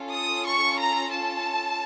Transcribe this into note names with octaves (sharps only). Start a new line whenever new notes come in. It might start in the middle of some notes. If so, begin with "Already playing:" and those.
Already playing: C#4 F4 A4
D#6
C#6
A#5
A5